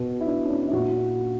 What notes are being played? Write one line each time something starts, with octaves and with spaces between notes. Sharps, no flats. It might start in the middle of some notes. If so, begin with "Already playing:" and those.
Already playing: B2
E4
D4
C#4
D4
E4
A#2 F#4